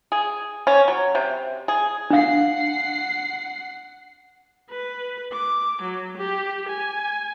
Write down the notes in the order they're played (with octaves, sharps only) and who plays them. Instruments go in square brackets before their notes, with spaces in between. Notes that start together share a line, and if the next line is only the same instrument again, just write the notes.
[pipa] G#4
C#4
F#3
C3
G#4
[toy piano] D4 F5 [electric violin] F#5 C7
[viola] B4
D6
F#3
G4
G#5